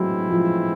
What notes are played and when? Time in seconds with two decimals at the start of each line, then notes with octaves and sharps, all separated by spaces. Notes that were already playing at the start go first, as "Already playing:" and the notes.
Already playing: A2 E3 F#3 G#3 C4 E4
0.30 F3